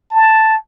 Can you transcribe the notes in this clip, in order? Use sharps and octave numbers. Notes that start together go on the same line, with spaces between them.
A5